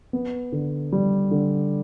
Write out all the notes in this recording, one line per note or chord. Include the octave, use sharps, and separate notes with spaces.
B3
D3
G3
D3